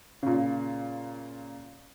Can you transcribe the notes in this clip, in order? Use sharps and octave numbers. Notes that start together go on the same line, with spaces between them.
A#2 C#3